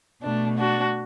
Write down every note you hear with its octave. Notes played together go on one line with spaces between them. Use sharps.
B2 A3 D4
D4 F#4